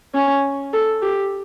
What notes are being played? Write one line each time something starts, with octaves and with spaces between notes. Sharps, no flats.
C#4
A4
G4